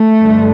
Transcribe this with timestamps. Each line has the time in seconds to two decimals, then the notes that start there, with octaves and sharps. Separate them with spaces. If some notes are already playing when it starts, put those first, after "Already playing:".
Already playing: A3
0.21 G2 D3